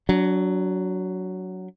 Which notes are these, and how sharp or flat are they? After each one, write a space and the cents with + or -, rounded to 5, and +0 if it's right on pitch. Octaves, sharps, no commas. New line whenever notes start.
F#3 +5 D4 -30